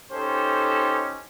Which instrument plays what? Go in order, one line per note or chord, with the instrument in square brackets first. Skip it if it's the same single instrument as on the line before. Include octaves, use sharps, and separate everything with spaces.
[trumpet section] C#4 D#4 G4 A4 C5